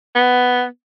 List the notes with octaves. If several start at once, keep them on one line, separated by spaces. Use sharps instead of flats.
B3